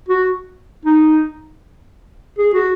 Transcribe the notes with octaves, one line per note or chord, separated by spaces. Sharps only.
F#4
D#4
G#4
F#4